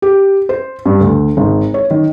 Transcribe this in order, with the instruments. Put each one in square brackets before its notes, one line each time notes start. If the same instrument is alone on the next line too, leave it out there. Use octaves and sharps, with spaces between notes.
[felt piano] G4
C5
G2
D2
G#1
C#5
D#3